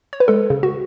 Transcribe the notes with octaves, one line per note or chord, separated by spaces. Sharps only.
C#5
B4
G#3 A4
C#3
F#4